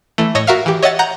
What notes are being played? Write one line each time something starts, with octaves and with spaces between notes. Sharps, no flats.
E3 A3
A2 C#5 D#5 E6 G#6 A#6
F#4 A#4 E5 F5 F6
E3 G4
C#5 D#5 E5 F#5 A6
F#5 A#5 G6